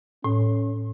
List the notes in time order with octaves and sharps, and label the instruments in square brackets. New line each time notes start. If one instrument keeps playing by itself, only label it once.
[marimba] A2 [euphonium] C#4